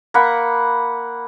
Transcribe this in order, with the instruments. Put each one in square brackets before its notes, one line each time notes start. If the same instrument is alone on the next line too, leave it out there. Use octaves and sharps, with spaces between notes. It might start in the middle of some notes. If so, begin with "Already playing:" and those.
[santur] A#3 F#5 B5